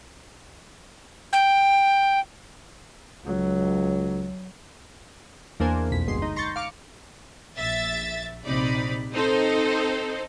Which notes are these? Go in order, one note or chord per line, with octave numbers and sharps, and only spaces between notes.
G5
C#2 F#3
E2 A#3 D4 C5 G#5
B1 F2 B6
G1 D2 G#3 C6
D#4
A#5 C6 C#6 G6 A6
F5 D6 F6 C#7
A#1 E5 A6
A#1 C3 D#4 D5 B5
C4 D#4 A4 C5